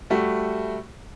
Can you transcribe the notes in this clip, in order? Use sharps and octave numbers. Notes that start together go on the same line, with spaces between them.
G3 A3 F#4